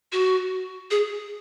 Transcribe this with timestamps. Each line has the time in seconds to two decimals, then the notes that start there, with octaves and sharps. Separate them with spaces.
0.12 F#4
0.91 G#4